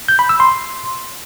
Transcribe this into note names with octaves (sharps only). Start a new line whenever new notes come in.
G6
B5
E6
C6